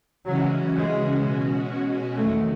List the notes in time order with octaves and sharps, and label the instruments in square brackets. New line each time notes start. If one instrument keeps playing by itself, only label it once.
[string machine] C#3 E3 G#3 C#4 F#4 [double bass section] F#3
[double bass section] G#3
[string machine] B2 G#3 C#4 F#4
[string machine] E2 D#3 F#3 [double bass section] A3